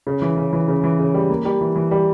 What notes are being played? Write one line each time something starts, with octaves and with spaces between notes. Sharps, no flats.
C#3
E3
C#3
E3
C#3
E3
C#3
G3
A#3
G3
E3
E3
G3